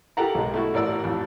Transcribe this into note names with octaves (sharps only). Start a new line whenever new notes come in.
G4 A4 A#4 F#5 A5 A#5
B1 G#3
A3 E4 F#4
A1 A#4 D5 F#5 E6
A1 F2